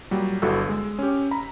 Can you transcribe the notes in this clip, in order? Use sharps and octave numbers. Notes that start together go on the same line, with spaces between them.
A#2 F#3 G3
G1 G2 E4 F#4 A4 E6
G#3
C#4 G4
A#5 B5